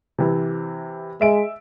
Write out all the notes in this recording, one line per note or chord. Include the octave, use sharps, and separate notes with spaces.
C3 E3
G#3 E5 D7